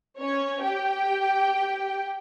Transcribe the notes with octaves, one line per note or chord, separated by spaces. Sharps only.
C#4 C#5
G4 G5